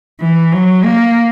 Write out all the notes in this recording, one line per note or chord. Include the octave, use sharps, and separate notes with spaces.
E3
F#3
A#3